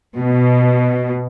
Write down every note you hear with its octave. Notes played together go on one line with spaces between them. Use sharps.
B2